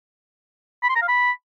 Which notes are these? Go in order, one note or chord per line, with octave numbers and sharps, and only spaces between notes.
B5
C6
A#5
F5
B5